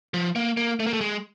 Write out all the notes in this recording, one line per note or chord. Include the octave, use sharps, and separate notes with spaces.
F3
A#3
A#3
A3
A#3
A3
G#3